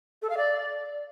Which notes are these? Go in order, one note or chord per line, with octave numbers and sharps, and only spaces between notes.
A4
F5
D5